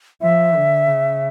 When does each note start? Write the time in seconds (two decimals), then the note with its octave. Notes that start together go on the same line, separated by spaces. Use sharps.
0.22 F3 E5
0.55 D3
0.88 C#3